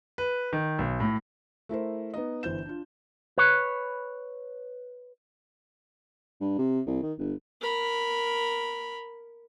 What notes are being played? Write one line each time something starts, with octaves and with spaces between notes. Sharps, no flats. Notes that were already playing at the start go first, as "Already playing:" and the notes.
B4
D#3
B1
A2
A3 E4 A#4 C5
B3 D#4 D#5
G1 E3 C5 G6 E7
D4 F4
B4 C#5
G2
C3
C2
D#3
G1
A#4 B5